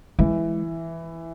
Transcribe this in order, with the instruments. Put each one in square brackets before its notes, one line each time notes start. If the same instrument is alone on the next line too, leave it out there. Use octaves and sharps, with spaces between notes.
[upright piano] E3 [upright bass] G#3